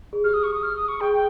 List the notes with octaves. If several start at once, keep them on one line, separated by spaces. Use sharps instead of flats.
G#4
G4 F6
D#6
C#6
D#6
F6
D#6
C#6
G#4 G5
G5